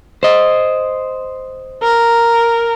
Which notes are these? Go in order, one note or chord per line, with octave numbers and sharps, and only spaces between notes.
C5 D#5
A#4